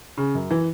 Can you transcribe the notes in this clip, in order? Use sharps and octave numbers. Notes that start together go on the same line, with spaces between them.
C#3
F#2
E3